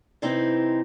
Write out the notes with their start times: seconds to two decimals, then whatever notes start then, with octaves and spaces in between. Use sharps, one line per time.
0.22 C3 E3 C4 D#4